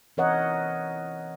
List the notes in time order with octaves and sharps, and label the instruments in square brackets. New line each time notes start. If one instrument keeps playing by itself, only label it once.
[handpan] E3 C4 A#4 C#5 D#5 F#5